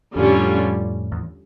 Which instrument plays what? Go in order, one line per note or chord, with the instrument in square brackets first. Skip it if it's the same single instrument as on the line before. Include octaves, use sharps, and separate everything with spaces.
[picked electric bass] F2 A2 [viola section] D3 G3 C#4 F4
[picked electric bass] E2